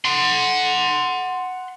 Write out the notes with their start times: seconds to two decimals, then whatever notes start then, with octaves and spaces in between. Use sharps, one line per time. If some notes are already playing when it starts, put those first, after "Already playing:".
0.05 F#5 C6